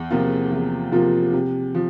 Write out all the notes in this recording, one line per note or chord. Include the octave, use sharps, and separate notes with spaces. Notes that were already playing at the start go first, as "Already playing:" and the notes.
Already playing: E2
C3 F3 A#3 F4
E2
C3 F3 A#3 F4
C3
F3